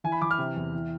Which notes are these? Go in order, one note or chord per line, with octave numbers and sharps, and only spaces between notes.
E3 G#5
B5
E3 D6
F6
C3
E2
E3